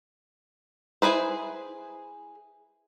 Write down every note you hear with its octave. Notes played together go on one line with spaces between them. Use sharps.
E4 G#4 B4 C5